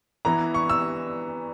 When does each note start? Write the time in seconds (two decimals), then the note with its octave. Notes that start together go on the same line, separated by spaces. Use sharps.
0.25 E3 B3 E4 A#5
0.54 C#6
0.70 E6